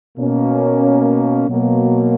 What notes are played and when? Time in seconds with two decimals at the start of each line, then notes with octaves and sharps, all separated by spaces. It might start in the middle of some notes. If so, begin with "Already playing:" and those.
0.16 B2 A#3 C#4
1.48 B2 F#3 A#3